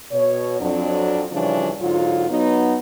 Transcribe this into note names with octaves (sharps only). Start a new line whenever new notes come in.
B2 C#5
F2 F#3 D4
C#3 E3 F3 G3 C#4 D4
G#2 D3 F#3 F4
F#3 B3 D#4